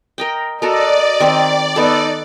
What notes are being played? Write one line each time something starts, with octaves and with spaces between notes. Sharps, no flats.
A#4 D#5 G5
F#4 A4 A#4 D5 D#5
D#3 C4 D6
B3 D#4 A4